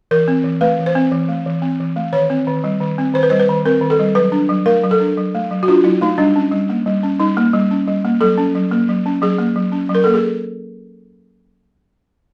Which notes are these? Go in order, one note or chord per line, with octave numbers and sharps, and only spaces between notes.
E3 A#4
C4
E3
A3 B4
E3
C5
C4
E3
A3
E3
C4
E3
A3
D#3 C#5
C4
D#3
G3
D#3
C4
D#3 C5
B4
G3 C5
B4
D#3
C4 A#4
D#3
A4
G3
F#3 B4
D4
F#3
A3 A#4
F#3
A4
D4
F#3
A3
F#3
F#4
D4 F4
F#3 E4
A3 D#4
G3 D4
C#4
G3
A#3
G3
C#4
G3 D#4
A#3
G3
C#4
G3
A#3
F#3 A4
C#4
F#3
A#3
F#3
C#4
F#3 G#4
A#3
F#3
C#4
F#3
A#4
A#3 A4
G#4